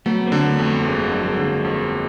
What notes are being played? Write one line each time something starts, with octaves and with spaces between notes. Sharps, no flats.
F#3 A3 B3
A#3 C4
D3
A3 B3
F2
A3 B3
G1 G#3 A#3
F#3
G#3 A#3
D3
F2